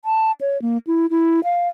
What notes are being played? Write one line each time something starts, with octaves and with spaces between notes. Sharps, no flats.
A5
C#5
A#3
E4
E4
F5